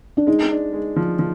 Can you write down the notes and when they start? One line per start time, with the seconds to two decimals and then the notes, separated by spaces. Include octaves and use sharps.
0.17 D4
0.27 G#3 D#4
0.51 D4
0.73 G#3
0.96 F3
1.19 F3